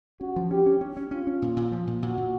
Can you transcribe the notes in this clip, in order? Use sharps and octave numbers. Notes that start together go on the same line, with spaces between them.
C#4 F#4
F3
C#4 G4
C#4
C#4
C#4
C#4 F4
C#4
A#2
A#2
F3
A#2
A#2 F#4
A#2